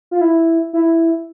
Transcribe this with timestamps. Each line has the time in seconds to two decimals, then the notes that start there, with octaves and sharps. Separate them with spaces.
0.11 F4
0.21 E4
0.73 E4